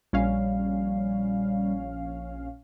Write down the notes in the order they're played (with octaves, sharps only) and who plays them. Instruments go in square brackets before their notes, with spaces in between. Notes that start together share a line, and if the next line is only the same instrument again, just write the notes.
[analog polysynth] A#1 C#4 F5 [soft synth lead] G3